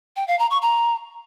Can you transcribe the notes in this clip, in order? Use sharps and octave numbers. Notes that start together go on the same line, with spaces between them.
G5
F5
A#5
C#6
A#5